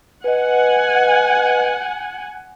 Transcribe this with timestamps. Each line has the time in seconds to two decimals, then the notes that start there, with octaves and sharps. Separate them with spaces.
0.24 B4 D#5 F#5 G#5